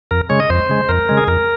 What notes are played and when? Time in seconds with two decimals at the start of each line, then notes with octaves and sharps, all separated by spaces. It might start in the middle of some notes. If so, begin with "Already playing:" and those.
0.11 F2 A#4
0.29 C#3 G#3 C#5
0.40 D#5
0.50 F2 C5
0.69 C#3 G#3
0.89 F2 A#4
1.09 C#3 G#3
1.17 G#4
1.27 F2 A#4